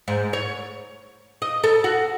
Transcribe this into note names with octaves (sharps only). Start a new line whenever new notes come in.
G#2
C#5
D#5
A4
F#4